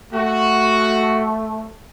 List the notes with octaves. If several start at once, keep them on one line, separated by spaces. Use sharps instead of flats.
A3 F#4